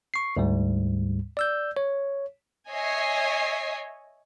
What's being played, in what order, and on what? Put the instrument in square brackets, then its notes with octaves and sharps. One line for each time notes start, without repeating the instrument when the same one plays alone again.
[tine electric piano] C#6 C7
D2 G#2 G3
D5 E6 G6
C#5
[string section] C#5 D#5 E5 G#5 C7